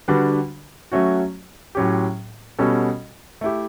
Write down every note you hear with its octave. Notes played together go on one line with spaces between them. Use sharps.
D3 G3 D4 F#4 B4
F#3 A3 C#4 F#4
A2 F#3 C#4 G4
B2 G3 C#4 F#4 A4
A3 E4 G4